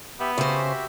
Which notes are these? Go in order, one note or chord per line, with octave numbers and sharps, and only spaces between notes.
B3 G4 E5
C#3 F#4 G4 C5 E5